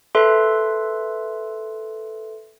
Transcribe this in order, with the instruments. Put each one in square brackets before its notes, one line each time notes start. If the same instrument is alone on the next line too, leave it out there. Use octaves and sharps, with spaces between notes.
[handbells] A4 B4 E5 C6